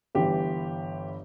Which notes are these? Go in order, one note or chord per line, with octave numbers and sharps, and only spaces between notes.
G1 G2 E3 G4